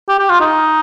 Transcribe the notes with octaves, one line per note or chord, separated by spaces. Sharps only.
G4
G4
F4
D#4